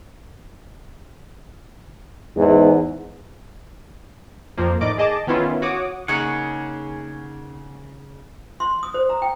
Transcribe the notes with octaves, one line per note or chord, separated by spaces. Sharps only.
E2 G#2
F2 F3 A#3
A2 D#3 D5 D#5 D6 D7
G#4 D#5 A5 D6
D#3 B3 C#4 E4 F4
F#4 C#5 D6 D#6
C#3 A#3 D#4 G#4 C#5 F#5
C6
D#6
C5
A#5
G5